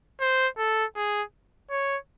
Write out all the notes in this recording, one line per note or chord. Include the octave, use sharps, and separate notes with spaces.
C5
A4
G#4
C#5